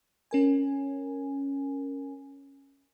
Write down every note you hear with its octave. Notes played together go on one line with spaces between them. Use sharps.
C#4 A#4 G#5